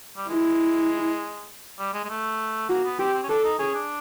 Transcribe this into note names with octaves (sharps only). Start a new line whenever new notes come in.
G3
G#3 E4
G3
G#3
G#3
A3
A#3 F#4
B3
C4 G4
C4
C#4
D4 A4
D#4
C#4 G#4
D4